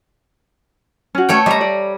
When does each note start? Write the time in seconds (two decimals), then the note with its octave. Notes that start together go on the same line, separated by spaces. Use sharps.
1.15 C#4 F#4
1.29 A3 C#5 G5
1.46 G3 D#5 A#5
1.61 D5